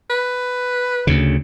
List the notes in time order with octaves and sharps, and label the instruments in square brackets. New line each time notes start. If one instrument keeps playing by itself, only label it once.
[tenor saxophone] B4
[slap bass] D2 C#3